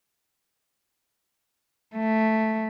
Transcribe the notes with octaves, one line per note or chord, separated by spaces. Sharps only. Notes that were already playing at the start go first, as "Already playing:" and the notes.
A3